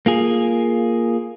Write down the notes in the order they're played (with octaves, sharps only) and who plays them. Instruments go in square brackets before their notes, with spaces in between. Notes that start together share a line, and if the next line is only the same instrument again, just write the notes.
[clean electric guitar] A#3 F4 G#4